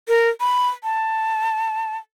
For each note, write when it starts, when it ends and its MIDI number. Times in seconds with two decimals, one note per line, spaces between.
0.08 0.29 70
0.40 0.68 83
0.84 1.97 81